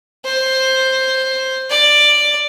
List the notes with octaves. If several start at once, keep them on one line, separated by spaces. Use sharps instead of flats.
C5
D5